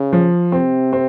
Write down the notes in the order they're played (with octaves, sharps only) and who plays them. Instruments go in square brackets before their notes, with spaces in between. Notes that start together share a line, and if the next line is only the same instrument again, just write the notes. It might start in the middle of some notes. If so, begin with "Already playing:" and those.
Already playing: [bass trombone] C#3
[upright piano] F3
[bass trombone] C3 [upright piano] C4
[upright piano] C4